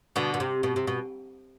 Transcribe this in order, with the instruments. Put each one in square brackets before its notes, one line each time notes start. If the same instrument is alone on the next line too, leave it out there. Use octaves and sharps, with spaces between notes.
[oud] B2 D3
B2
C3
B2
C3
B2